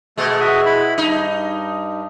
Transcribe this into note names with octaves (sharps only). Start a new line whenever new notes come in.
B2 G#3 A3 A4
F#4 E5 D#6
E4 B5
G2 D#4